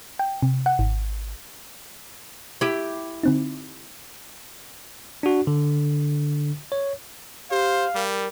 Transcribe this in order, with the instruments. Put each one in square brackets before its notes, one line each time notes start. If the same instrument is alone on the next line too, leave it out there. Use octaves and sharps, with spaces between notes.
[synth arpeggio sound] G5
C3
F#5
G#1
[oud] E4 G4
[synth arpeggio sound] D3 C4 D#4
[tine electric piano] D4 F#4
D3
C#5
[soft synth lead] G4 [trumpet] C5 [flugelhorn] F5
[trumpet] G3 [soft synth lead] A#4